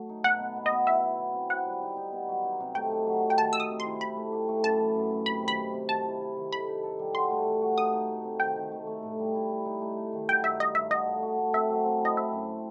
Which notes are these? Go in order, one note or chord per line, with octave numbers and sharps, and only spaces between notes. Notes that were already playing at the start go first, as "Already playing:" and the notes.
Already playing: F#3 A3
D#4
B2 F#5
B3
B3
D#5
B3
E4 E5
E4
F#3
C4
F#4 F#5
G3
D#4
D#4
B3
F#3
D#4
C3
A3 G5
D#4
F#3
F#3
G5
D#3 A5
D#3 E6
D#6
C3
C6
E4
D#4 B5
A3
G4
A3
F#2 A5
E3
F#2
F#2
C3 B5
D#3
B5
C3
C3
D#3 A5
E4
E4
D#3
A4 B5
D#4
A4
G3
F#4 C6
A3
E3
F#4
D#4 D#6
D#4
A3
C4
D#3 G5
D#3
A3
A3
A2
G3
E4
E4
D#4
A3
A3
D#3
F#3 G5
G2 E5
G2 D#5
G2 E5
F#4 D#5
A3
F#4
A3
C4 E5
F#3
C4
E4 D#5
C4 E5
F#2